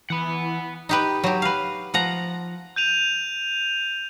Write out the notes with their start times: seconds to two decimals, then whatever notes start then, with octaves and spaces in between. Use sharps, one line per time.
0.10 E3 F#5 B5
0.89 D#4 G4 B4
1.24 F#3 G4
1.42 B4 F5
1.94 F3 F#5 A#5
2.76 G6 D#7 F7